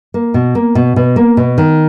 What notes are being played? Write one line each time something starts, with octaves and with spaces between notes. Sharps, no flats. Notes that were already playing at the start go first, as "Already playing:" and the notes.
A#3
B2
A#3
B2
B2
A#3
B2
D#3